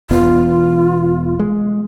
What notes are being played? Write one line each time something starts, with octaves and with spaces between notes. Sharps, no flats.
E1 E2 B3 F4
G#3